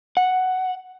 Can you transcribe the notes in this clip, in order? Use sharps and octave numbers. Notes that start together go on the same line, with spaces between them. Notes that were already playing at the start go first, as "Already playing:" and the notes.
F#5